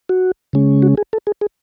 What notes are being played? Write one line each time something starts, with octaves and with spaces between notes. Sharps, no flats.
F#4
C#3 G#3 C#4
F#4
G#4
A4
G#4
G#4